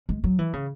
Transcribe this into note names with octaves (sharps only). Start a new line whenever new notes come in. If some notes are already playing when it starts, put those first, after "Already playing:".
G#3
F#3
E3
C#3